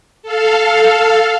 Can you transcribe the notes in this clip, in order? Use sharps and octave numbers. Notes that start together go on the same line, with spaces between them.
A4 F5